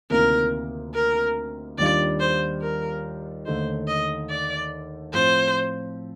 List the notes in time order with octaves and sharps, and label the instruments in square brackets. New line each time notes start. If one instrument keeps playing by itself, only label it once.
[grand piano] D2 C3 D#3 A#3 F4 [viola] A#4
[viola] A#4
[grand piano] D#2 D#3 G3 D4 F4 [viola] D5
[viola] C5
A#4
[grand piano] D#2 D3 A3 D#4 [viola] C5
[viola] D#5
D5
[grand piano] A2 F3 C4 [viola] C5